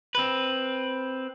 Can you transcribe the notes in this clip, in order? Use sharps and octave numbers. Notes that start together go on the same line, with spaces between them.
C4 B4